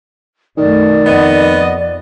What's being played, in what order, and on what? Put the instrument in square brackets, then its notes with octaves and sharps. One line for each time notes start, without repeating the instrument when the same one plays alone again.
[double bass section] F#2 B2 A3 [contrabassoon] D#3 [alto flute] D5
[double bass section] F2 [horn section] B3 D#5